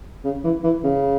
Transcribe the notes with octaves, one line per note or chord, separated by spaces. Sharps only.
C#3
E3
E3
C#3